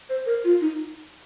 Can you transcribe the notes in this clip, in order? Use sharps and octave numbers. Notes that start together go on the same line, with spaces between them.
C5
A#4
F4
D#4